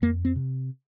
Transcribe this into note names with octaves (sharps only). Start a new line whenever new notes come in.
F2 A#3
C4
C3